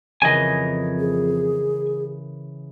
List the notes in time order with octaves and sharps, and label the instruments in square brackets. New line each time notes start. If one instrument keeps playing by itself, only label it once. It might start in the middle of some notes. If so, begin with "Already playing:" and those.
[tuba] F2 [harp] C#3 E3 A#4 [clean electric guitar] D#5 G#5
[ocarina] G#4